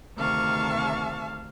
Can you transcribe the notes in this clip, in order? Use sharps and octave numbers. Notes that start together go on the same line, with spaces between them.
D2 C3 D#3 F5 A5 C#6